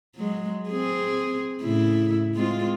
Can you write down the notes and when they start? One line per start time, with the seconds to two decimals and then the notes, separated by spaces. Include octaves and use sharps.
0.16 F#3 G#3
0.70 C4 G#4
1.62 A2 C#3 E4
2.35 G#3 C4 F4